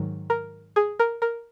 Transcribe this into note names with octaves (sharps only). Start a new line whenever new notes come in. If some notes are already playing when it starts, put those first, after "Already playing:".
Already playing: G#2 D#3 F#3
A#4
G#4
A#4
A#4